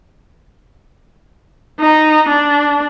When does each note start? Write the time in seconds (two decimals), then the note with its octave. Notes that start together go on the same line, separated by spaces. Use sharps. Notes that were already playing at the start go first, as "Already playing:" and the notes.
1.80 D#4
2.29 D4